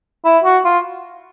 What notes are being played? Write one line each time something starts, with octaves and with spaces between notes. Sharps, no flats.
E4
F#4
F4